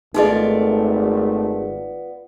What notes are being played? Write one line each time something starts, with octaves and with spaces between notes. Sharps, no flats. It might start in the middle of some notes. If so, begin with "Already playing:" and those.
G#1 A3 B3 D#4 F4 G#4 D5 D#5